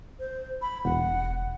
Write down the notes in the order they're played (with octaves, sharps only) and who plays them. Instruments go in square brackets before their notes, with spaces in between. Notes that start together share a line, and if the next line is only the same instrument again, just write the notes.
[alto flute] C5
B5
[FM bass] E1 [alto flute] F#5